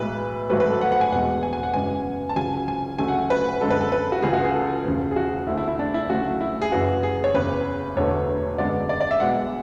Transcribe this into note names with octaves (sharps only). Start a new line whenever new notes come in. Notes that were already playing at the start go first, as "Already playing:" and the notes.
Already playing: B1 A2 E3 G#3 B4
G#1 G#2 F#3 A3 B4
B4
A4
F#5
F#5
G#5
E1 E2 B2 G#3 F#5
G#5
G#5
F#5
F#2 C#3 E3 G#3 B3 G#5
A5
C#2 C#3 F#3 G#5
G#5
D2 C#3 F#3 A3 G#5
F#5
B4
F#2 D3 G#3 B3 A4
B4
A4
B4
F#4
C#2 C#3 E3 G#4
F#4
G#4
A4
E1 D2 C#3
G#4
F#4
D2 D3 A3 E4
E4
E4
D4
E4
D2 C#3 F#3 A3 F#4
E4
G#4
F#1 F#2 E3 F#4
G#4
C#5
F#1 E2 C#3 B4
E1 E2 D3 A3 C#5
F#2 D3 G#3 B3 D5
D5
D5
E5
B1 B2 G#3 B3 F#5